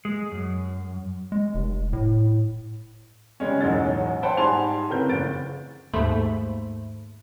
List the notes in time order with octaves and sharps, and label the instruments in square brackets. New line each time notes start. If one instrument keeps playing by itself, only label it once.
[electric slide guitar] G#3
F#2
[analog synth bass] G#3
F1
A2
[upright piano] C#3 G3 G#3 C#4
E1 A1 F#3 G#3 D#4 A6
C5 F#5 G5 A5 B5
G#2 G3 G#5 A5 C6 F7
A2 C#3 C4 A#4 B4 G6
F#1 A6 D7
[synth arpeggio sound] D#2 G#2 A3 C5 B5